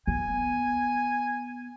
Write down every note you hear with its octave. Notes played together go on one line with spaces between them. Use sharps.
B3 G#5